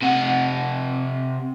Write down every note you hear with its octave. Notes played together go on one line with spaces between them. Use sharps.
C3 F#5